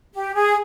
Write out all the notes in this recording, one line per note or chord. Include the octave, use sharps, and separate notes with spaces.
G4
G#4